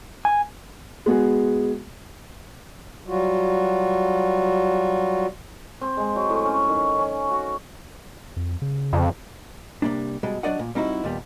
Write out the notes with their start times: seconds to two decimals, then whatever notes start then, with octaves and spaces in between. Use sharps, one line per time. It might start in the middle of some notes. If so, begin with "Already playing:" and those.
0.25 G#5
1.06 G#3 B3 F#4 G#4
3.07 F#3 G3 F4 F#4
5.81 C4
5.97 G#3
6.16 F#3
6.29 A2
6.45 C#4
6.69 D#3
6.98 C#4
7.31 F#4
8.36 F2
8.62 C#3
8.93 F2
9.82 C3 G3 G#3 A#3 D4
10.23 B2 G3 G#3
10.43 F#3 D4 F#4 D5 D#5 F#5
10.59 A#2
10.75 G3 C4 D#4 E4 F#4
11.04 D#2 A#2 G3 B3